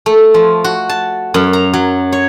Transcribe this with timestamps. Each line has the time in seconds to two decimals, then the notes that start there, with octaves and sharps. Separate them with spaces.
0.06 A3
0.34 F3
0.64 F#4
0.89 A5
1.34 F#2
1.53 A#5
1.73 F#3
2.12 C#5